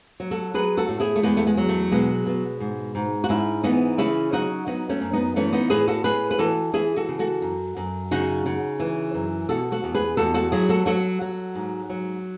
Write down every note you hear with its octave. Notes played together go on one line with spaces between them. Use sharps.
F#3
F#4 A4
F#3 G#4 B4
F#4 A4
A2
E4 G#4
A3
E2 G#3 B3
A3
G#3
F#3
A3
B2 G#3 B3
B2
G#2
G#2
F#4
G#2 C#4 E4
E3 B3 D#4
C#3 C#4 E4
F#3 D#4 F#4
F#3 B3 D#4
A3 C#4
F#2
B3 D#4
E3 A3 C#4
B3 D#4
A2 G#4 B4
F#4 A4
A2 G#4 B4
B4
E3 F#4 A4
E3 E4 G#4
F#4 A4
C#3
F#4 A4
F#2
F#2
C#3 D#4 F#4
C#3
E3
F#2
B2 F#4 A4
F#4 A4
E2
G#4 B4
E2 F#4 A4
F#4 A4
F#3 E4 G#4
F#4 A4
F#3 F#4 A4
F#3
G#2
F#3